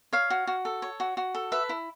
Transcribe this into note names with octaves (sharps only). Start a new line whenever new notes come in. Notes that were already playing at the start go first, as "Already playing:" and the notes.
C#5 F5
F#4
F#4
A4
C#5
F#4
F#4
A4
B4 E5
E4